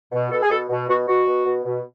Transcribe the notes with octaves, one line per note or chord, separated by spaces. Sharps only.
B2
B2 A4
G#4
B2 A4
B2
B2 F#4
B2 F#4
B2
B2
B2